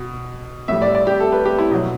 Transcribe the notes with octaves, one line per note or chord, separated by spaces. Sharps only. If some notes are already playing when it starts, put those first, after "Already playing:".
Already playing: B2
A2 G3 E5
D5
D5
G4
A4
B4
G4
E4
B2 F#3